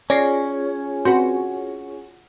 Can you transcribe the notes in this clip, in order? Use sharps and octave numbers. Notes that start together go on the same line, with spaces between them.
C#4 F4 G#4 C#5 D5 A#6 C7
C4 F#4 B4